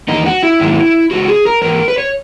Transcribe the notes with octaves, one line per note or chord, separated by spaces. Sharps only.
E2 D#3 A#3 D#4
F#4
E4
G#2 D#3 F#3 A#3
C#3 G#3 B3 F#4
G#4
A#4
G#2 E3 A#3 A#4
B4
C#5